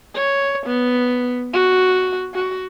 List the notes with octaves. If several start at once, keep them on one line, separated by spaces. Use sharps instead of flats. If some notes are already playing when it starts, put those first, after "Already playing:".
C#5
B3
F#4
F#4